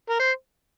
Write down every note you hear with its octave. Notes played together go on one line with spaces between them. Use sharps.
A#4
C5